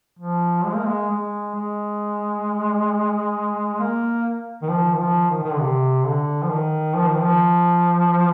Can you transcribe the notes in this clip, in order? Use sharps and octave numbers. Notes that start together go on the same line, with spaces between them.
F3
G#3
A#3
G#3
G#3
G#3
A#3
D#3
F3
D#3
F3
D#3
D#3
D3
C3
D3
F3
D#3
F3
D#3
F3